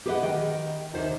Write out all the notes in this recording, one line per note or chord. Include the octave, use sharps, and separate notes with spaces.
G4 G#4 B4 C#5 D#5 F#5
D#3 D#5 G5
D#2 C3 D#3 D#4 C5